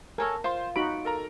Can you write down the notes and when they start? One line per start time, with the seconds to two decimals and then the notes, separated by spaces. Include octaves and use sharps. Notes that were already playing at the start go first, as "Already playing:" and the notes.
0.18 A4 A#4 C#5 G#5
0.44 F4 C5 C6
0.76 D#4 F#4 B5 D7
1.05 A4 A#4 A#5